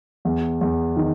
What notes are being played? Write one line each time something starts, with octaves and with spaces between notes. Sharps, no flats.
E2
E2
D#3